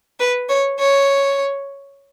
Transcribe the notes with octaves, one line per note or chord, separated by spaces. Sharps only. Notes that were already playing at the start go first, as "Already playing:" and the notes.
B4
C#5
C#5